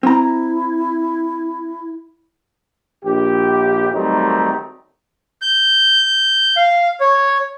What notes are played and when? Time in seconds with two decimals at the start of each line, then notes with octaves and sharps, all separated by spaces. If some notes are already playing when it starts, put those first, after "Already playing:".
0.03 C4 E4 A#5
3.05 A#1 G4
3.92 D#3 F#3 G3 A3 C4 D#4
5.42 G6
6.56 F5
7.00 C#5